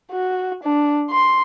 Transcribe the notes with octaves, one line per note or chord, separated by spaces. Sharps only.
F#4
D4
C6